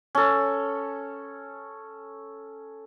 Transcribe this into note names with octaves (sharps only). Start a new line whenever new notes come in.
C#4 A4